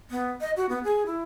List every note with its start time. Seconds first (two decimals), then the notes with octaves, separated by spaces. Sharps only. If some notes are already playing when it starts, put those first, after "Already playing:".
0.11 B3
0.41 D#5
0.57 F#4
0.69 B3
0.84 G#4
1.06 E4